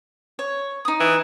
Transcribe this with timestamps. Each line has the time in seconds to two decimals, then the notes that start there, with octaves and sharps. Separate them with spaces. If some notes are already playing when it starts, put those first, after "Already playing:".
0.39 C#5
0.85 D#4 D#6
1.00 E3